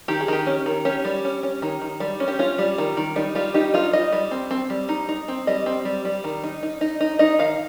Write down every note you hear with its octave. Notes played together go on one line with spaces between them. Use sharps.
D#3 G4
G#4
D#3 G4
C#4
D#3
C#4 G4
G3
C#4
C#4
D#3
D#3
G3
C#4
G4
C#4 F4
G3
D#3
D#3
G3 D#4
G3 F4
D#4 G4
D#4 F4
G3 D#5
G3
C4
C4
G3
D#4
D#4
C4
G3 D#5
C4
G3
G3
D#3
D#4
D#4
D#4
D#4
D#4 D#5
D#3 F5